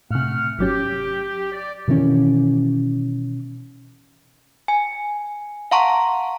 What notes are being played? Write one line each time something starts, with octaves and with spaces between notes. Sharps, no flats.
A2 C3 A3 F#5 F6
G1 F#3 C#4 G4
D5
B2 D#3 E3 C#4
G#5
F5 F#5 A5 A#5 C6 C#6